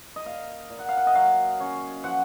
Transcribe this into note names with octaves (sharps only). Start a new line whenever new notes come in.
D#5
A#2 F5
A#2
F#5
F5
F#5
D#5
F#3 F5
C#4
F3 F#5